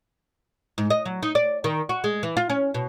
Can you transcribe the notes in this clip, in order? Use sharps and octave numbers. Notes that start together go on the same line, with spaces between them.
G#2
D#5
F#3
D#4
D5
D#3
F#4
G#3
E3
F4
C#4
B2